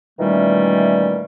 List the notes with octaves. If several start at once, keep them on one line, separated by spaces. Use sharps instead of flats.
A#2 D#3 E3 G3 A3 C#4